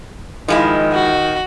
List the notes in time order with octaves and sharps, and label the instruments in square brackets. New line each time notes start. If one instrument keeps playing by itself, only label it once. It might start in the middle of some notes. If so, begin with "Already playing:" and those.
[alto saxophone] D#3 [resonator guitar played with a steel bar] F3 G#3 E4
[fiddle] F#4